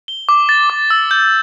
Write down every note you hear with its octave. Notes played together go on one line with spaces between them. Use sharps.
G7
D6
A6
D6
E6
G6